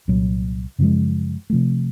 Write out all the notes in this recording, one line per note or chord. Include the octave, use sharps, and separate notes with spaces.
C2 A#2 F#3
F#2 C#3 F3 G#3
C3 F3 A3